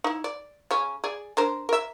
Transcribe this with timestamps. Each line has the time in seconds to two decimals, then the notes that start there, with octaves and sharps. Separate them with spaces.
0.04 D#4 E4
0.24 D5
0.71 C#3 C#4
1.04 G#4 D5
1.37 D4 A#4 C5
1.69 A#4 E5